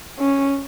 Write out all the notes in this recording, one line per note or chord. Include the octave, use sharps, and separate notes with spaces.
C#4